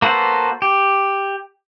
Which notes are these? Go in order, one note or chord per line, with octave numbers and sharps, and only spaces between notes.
A#3 F#4 A4 B4 C5
G4